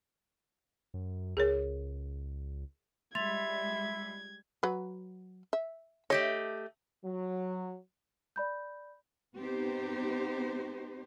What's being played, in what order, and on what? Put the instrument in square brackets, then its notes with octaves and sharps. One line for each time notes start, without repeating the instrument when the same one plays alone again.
[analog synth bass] F#2
[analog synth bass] C#2 [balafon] G#4 A#4 C#5
[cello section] G3 G#3 [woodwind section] E5 B5 [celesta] C6 A6 F7 [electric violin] G#6
[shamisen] F#3 B4
E5
[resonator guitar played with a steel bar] A3 G4 D#5 [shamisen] C#5
[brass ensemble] F#3
[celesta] D5 B5 G6
[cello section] B3 C4 D#4 G4 C5